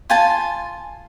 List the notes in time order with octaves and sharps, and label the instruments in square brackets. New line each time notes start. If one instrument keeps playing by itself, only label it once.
[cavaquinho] F4 G#5 A5